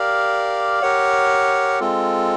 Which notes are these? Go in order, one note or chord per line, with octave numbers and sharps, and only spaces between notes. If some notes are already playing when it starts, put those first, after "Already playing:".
Already playing: G4 A#4 D5 F5
G4 A#4 C#5 F#5
G#3 C4 F4 A4